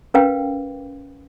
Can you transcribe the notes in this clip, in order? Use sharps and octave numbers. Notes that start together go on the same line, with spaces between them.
C#4 A#4 B4 F5 G5